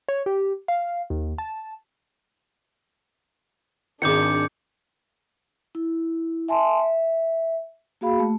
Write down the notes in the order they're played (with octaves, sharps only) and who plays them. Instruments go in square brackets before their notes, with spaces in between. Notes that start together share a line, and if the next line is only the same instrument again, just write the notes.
[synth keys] C#5
G4
F5
D#2
A5
[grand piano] G#1 D#3 [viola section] D4 G#4 [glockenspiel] D6 G6 C#7
[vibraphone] E4
E5 G#5 A5 C6
E5
A#3 F#4 G#4 F5 B5
A3